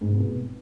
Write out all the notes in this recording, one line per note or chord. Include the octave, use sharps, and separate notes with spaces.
G#2
C3
B2